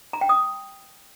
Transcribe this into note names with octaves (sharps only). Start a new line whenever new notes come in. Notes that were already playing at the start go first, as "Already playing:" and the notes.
A#5
G5
D#6